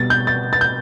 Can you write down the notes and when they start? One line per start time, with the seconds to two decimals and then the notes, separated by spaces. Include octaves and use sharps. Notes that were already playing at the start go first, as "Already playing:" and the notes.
Already playing: B2 G3 B3 A6
0.10 G6
0.27 A6
0.53 A6
0.61 G6